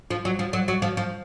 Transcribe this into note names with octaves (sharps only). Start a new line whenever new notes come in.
F3
F#3
F3
F#3
F#3
F3
F3